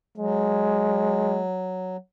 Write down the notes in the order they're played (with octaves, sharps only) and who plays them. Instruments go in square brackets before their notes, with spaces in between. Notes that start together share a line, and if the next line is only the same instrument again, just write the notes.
[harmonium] F#3 [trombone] G#3